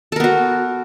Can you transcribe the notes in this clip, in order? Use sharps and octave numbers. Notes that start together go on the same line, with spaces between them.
B3 F#4 A4 A#4